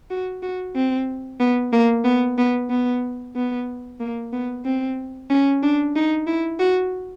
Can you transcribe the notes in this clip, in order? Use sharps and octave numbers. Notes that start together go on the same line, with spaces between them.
F#4
F#4
C4
B3
A#3
B3
B3
B3
B3
A#3
B3
C4
C#4
D4
D#4
E4
F#4